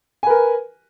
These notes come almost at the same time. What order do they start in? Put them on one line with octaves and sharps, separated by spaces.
G#5 B4 A#4